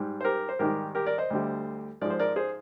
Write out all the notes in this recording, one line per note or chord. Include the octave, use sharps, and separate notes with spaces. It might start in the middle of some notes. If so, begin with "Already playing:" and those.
Already playing: G#2 G3
C5
G4 A#4
C5
G#2 D#3 G3 G4 A#4
G4 A#4
A#4 D5
C5 D#5
D2 D3 G3
G#2 F3 G#3 D5
C5
A#4 D5
G#4 C5